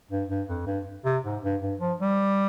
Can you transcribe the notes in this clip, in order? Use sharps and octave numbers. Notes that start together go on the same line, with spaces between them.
G2
G2
F2
G2
C3
G#2
G2
G2
F3
G3